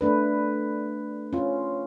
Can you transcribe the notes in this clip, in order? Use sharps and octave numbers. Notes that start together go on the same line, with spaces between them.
A3 D4 B4
C#4 F4